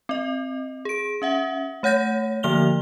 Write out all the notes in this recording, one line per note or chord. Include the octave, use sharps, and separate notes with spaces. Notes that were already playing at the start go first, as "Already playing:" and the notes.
C4 D#5
G#4 D7
C#4 E5 F#5
A3 C#5 F#5 G6 A#6
D3 F3 A#3 F6 F7 G7